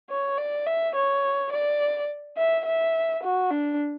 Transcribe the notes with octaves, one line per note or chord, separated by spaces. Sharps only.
C#5
D5
E5
C#5
D5
E5
E5
F#4
D4